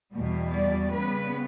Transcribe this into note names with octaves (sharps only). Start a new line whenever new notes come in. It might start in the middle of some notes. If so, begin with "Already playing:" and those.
E2 B2 G3
D5
C#3 G3 B3 B4